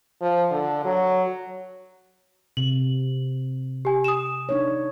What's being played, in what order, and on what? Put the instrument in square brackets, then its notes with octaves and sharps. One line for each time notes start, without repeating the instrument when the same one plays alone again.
[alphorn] F3
D3
F#3
[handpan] C3 [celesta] F#7
[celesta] G4 G#5
D#6 E7
[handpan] D4 D#4 C#5